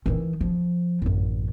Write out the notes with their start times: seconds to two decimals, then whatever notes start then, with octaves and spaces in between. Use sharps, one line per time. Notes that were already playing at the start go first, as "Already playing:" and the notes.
0.06 D#3 E3
0.41 F3
1.02 A1 F#2